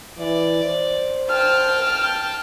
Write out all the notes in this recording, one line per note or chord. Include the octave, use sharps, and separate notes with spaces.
E3 D5
C5
G5 A5 F6